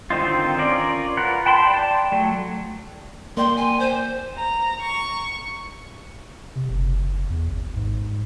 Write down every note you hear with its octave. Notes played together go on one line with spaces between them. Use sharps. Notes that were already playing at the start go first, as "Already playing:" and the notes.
D3 D#3 C4 D#4 F4
C#4 F4 A#4 D5
F4 A#4 B4 F#5
G5 A5 B5 C6
D5 G5 A5
F#3 A3
A#3 D5 G5 C6
G#5
C5
A#5
C#6
C3
F#1
E2
G#1
G#2